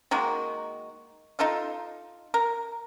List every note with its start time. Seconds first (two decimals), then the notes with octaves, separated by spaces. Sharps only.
0.11 D#3 G#3 A#3 F#4
1.39 D#4 F4 A4 F5
2.34 A#4